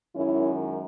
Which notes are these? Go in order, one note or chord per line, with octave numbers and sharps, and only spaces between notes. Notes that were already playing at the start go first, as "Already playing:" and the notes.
F#2 D#3 G#3 C#4 E4